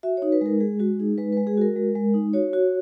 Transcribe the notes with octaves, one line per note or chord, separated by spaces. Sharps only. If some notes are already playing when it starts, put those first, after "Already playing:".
F#4 E5
D#4 C#5
B4
G#3 A#4
G#3 G#4
G#3 F#4
D#4 G#4
G#3 B4
G#3 B4
G#4
F#4 A#4
G#3
G#3
D#4
F#4 C#5
F#4